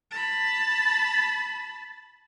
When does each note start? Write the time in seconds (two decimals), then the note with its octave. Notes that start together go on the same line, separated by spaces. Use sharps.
0.11 A5 B5